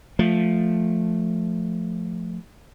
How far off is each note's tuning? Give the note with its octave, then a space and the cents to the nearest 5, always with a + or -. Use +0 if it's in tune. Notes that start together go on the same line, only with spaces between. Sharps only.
F3 +5 A3 +0